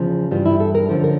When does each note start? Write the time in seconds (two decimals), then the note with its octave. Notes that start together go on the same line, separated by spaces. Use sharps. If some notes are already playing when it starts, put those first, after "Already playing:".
Already playing: E2 C#3 F3
0.31 G2 E3 G3 F4
0.46 E4
0.60 A4
0.75 A#4
0.89 F#2 D3 F3 A#4
1.04 A#4